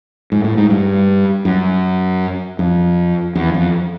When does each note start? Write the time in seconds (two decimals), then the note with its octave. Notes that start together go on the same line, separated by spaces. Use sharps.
0.32 G#2
0.44 A2
0.57 G#2
0.70 G2
1.45 F#2
2.59 F2
3.35 E2
3.54 F2